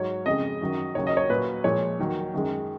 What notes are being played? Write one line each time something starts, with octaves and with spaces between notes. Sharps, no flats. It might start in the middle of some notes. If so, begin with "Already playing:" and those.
Already playing: G#2 F#3 C#5
F2 C#3 G#3 D#5
F#2 D#3 F#3
D#2 C#3 F#3 C#5
D#5
C#5
A#2 F#3 B4
A#2 F3 G#3 C#5
D#2 D#3 F#3
F#2 D#3 G#3